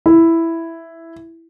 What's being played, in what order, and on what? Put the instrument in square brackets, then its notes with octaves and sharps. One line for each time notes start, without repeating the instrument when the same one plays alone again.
[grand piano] E4